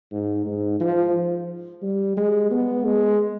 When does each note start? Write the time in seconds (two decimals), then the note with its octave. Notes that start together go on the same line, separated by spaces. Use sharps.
0.12 G#2
0.46 G#2
0.80 F3
1.82 G3
2.17 G#3
2.51 B3
2.85 G#3